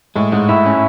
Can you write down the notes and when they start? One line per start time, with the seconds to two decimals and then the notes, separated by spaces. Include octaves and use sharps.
0.16 A2 G#3
0.32 G#2 G#3
0.49 A2 E4
0.66 C#4